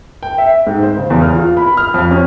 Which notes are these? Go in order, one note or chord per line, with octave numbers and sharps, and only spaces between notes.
G5
E5
G#2
C5
C#3
E2
F6
F4
B5
F6
F2
C#4